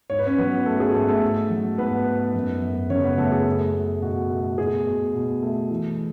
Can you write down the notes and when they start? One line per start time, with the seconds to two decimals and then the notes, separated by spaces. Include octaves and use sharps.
0.10 G#2 C#5
0.19 B4
0.27 C#4 C#5
0.38 F#3 B3 B4
0.66 G#2 A3 A4
0.80 G#4
0.94 G#2 A3 A4
1.08 A3 A4
1.22 G#2
1.50 F#3
1.78 G#2 B3 B4
2.06 G#2
2.34 F#2
2.62 F#2
2.90 C#3 C#4 C#5
3.04 B3 B4
3.18 F#2 A3 A4
3.32 G#4
3.46 A3
3.74 A3
4.02 B2 F#4
4.30 A3
4.58 B2 G#4
4.86 B2
5.14 B2
5.42 A3
5.70 E3